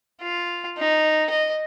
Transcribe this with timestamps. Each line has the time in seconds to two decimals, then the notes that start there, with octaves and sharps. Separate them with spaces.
0.22 F4
0.78 D#4
1.30 D#5